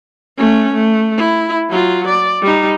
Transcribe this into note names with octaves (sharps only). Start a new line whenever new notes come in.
A3 C#4
A3
E4
F#3 F4
D5
G3 D#4